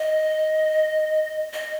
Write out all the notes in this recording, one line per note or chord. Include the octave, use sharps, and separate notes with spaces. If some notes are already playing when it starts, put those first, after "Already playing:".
Already playing: D#5
D#5